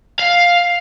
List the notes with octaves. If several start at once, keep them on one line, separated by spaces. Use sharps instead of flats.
F5